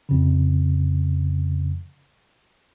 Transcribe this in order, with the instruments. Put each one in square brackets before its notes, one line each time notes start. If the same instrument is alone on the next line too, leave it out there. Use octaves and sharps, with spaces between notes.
[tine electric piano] F2 C#3